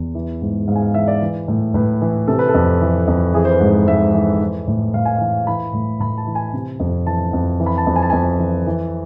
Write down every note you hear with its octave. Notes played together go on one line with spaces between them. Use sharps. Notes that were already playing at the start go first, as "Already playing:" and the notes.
Already playing: E2
E3
G#2
G#2 F5
G#5
F5
E3 E5
D5
E3
A2
A2 B4
E3
C3 A4
B4
A4
F2
E3
F2
E3 G#4
C5
B4
G#2
C5
G#2 E5
E3
E3
A2
A2 F5
G#5
E3 F5
E3 B5
A2
A2 B5
A5
E3
G#5
C3
F2
E3 A5
F2
E3
B5
A5
F2
G#5
A5
F2 G#5
E3
E3